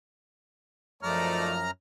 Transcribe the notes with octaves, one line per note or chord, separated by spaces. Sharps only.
F#2 F3 A3 D#4 D5 A#5 F6